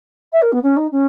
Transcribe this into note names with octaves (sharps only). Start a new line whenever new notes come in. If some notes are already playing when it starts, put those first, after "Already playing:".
E5
A#4
B3
C#4
D#4
C#4